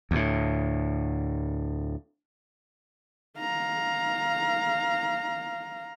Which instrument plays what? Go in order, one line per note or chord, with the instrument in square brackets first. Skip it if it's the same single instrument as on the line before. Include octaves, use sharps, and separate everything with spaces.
[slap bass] D2 A2
[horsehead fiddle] F5 A#5